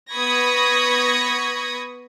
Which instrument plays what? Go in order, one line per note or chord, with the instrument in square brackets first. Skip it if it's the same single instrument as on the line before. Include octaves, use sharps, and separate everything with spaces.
[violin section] B3 B5 C#6 D#6 G#6 A#6